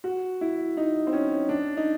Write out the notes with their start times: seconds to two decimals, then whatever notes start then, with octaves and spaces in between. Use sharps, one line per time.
0.04 F#4
0.41 E4
0.77 D#4
1.07 C4
1.13 C#4
1.49 D4
1.77 D#4